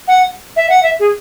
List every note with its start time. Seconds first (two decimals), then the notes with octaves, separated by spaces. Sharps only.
0.08 F#5
0.56 E5
0.70 F#5
0.83 E5
1.00 G#4